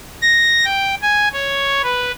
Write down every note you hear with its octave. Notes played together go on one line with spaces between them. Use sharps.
A#6
G5
G#5
C#5
B4